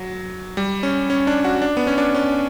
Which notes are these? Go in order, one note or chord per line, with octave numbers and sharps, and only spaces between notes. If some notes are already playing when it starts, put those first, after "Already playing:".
Already playing: F#3
G3
C#4
C#4
D4
F#4
D4
B3
C#4
D4
C#4